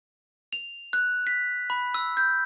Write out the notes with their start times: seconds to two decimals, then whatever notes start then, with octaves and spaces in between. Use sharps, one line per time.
0.53 F7
0.93 F#6
1.27 B6
1.70 B5
1.94 E6
2.17 G6